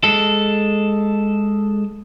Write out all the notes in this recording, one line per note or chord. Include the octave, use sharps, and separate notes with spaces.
G#3 A4